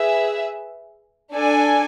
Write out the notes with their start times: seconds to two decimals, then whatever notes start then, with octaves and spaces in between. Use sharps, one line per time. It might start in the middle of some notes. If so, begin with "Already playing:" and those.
Already playing: G#4 B4 E5
1.32 D4 A4 D5 G#5